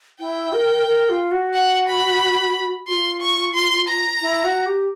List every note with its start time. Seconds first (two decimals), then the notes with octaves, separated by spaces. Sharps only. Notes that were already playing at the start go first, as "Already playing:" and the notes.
0.20 E4 G5
0.53 A#4
0.87 A#4
1.09 F4
1.31 F#4
1.54 F#5
1.87 B5
2.87 F#4 C6
2.91 F4
3.21 C#6
3.54 C6
3.88 A#5
4.21 E4
4.44 F#4
4.66 G4